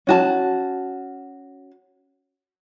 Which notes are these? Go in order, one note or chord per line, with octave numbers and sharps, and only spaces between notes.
C#4 F#4 A5